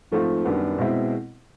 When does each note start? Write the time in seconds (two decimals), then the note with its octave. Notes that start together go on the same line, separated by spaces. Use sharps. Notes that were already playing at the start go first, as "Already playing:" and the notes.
0.12 G#2 F3 A3 C4 F4
0.45 F#2 D#3 G3 B3 D4
0.78 B2 G#3 C4 E4